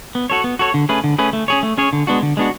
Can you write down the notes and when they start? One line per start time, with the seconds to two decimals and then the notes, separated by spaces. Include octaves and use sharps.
0.15 B3
0.30 F#4 A4 C#5
0.44 B3
0.59 F#4 A4 C#5
0.74 D3
0.89 A3 C#4 G#4 B4
1.04 D3
1.18 A3 C#4 G#4 B4
1.33 A3
1.48 C#4 G#4 C#5
1.63 A3
1.78 C#4 G#4 C#5
1.93 D3
2.07 G#3 B3 D4 F#4
2.23 D3
2.37 G#3 B3 D4 F#4